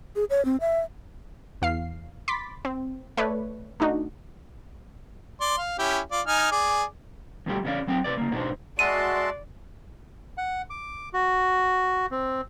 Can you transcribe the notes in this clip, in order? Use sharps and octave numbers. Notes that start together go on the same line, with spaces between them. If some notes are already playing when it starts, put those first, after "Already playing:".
G#4
C#5
C4
E5
E2 F5 C7
B5 C6 D6 A6 B6
C4
A3 B4 C#5 D5
A3 D4 D#4 F#4
D5 C6
F5
C#4 E4 G4
F4 D5
D#4 G#5 F6
G#4 D5 D6
F2 B2 F3 G3 A3 G4
E2 C#3 B3 C#4 D5 F5
F#3 C4 F#5 G5
C3 B4 D5
C#3 A#3
G#2 B2 D4 D#4 C5
G#3 F#4 D5 E5 A5 C6 D#7
F#5
D6
F#4
C4